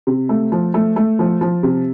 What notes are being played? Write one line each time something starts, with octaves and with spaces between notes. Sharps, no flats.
C3
A3
F3
A3
A3
F3
F3
C3